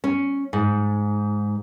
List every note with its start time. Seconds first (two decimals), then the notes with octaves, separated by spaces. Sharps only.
0.04 C#4
0.53 G#2